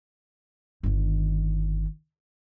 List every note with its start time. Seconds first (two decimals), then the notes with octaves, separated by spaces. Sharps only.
0.83 G1 D#3